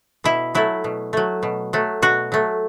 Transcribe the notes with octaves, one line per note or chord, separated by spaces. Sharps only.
B2 E4
F#3 A3 E4
B2
F#3 A3
B2
F#3 A3
B2 F#4
F#3 A3